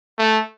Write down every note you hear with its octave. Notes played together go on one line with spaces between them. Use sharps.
A3